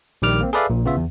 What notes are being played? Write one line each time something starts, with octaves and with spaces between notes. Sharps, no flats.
A#1 D#3 G3 D6 F6
A#3 C4
G#4 A4 B4 D5 E5 F5
A#1 A#2
C#3 B3 F4 E5
E2